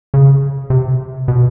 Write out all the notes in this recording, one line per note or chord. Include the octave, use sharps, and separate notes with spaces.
C#3
C3
B2